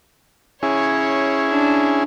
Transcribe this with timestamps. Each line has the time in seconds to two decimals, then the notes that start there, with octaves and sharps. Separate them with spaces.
0.63 C#4 E4 G#4 C#5
1.50 D4